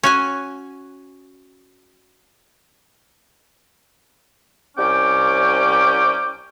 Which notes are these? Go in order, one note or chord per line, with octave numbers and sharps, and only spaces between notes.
C#4 F#4 G#5
C2 C#4 G5 D6